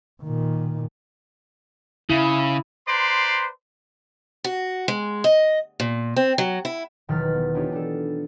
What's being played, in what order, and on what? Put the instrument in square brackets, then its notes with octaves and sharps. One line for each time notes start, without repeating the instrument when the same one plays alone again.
[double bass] A#2 D#3
[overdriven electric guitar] C#3 [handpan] E4
[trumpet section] B4 C5 D5 A#5 C6
[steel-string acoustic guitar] F#4
G#3
D#5
A#2
C4
F#3
E4
[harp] E1 D#3 F#3 B4 F6 A6
B3
B3 D4 D#4 F4 G4 C#5
D4 A4